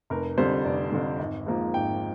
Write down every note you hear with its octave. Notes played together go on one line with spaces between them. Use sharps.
F1 A#4
F2 D3 G3 C5
F1 D5
F2 D3 G3
G#1
G#2 F3 A#3
G#1 G5